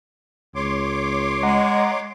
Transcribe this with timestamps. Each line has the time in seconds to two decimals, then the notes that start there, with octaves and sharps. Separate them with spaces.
0.55 C#2 C#5 C6 D6
1.43 G#3 D#5 F#5 A#5